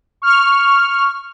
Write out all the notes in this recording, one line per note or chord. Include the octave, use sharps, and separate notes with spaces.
C#6 F6